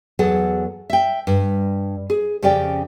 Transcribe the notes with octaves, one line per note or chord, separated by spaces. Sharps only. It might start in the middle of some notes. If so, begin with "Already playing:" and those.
E2 F#3 G#4 A4 F#5
E5 G5
G2
G#4
F2 C#3 C#4 G4 D5 G5